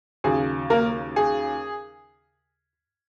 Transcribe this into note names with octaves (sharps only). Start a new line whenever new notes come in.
D#2 C#3 F#3 G#4
A#3 A#4
G#4